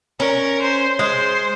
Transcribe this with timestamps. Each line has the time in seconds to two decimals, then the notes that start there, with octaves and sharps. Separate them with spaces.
0.20 C#4 A#4
0.62 C5
0.99 G#3 C5